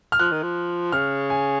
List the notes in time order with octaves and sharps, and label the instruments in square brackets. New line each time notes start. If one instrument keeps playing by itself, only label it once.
[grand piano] F6
[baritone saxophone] F3 [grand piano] F#6
[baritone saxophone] D#3
F3
[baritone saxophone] C#3 [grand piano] F6
[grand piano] G#5